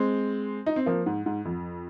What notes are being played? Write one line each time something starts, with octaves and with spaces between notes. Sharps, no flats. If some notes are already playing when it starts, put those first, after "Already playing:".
Already playing: G#3 C4
D#4
C4
F3 A#3
G#2
G#2
F2